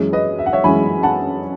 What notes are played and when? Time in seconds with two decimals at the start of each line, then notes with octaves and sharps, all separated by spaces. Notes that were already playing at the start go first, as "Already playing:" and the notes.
Already playing: F#2 E3 G#3 C#4
0.13 B4 D#5
0.39 E5
0.46 F#5
0.53 C#5 E5
0.64 F#2 E3 G#3 C#4 G#5 B5
1.03 F#5 A5